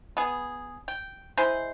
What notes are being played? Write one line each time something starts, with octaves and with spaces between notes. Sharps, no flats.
B3 G#4
G5
G#3 E4 G#4 C5